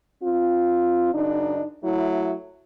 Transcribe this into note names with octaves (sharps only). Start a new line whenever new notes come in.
C4 F4
F#2 C#3 D4 D#4
F#3 A3 E4